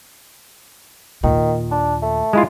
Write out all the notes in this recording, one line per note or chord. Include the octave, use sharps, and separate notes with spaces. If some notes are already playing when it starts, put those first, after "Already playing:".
D#2 A#2 D#3
D4
A3
G#3 E4 F4